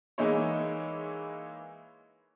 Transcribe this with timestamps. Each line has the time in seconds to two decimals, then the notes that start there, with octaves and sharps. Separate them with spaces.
0.18 E3 G#3 A#3 D#4 E4 C#5